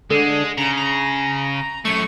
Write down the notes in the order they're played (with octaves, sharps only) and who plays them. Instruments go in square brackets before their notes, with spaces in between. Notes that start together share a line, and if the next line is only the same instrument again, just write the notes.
[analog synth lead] D3 [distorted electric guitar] G#3
[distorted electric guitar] C#3 [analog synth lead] A#5
[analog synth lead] A#5
[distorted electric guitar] F#2 A3 [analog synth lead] C#6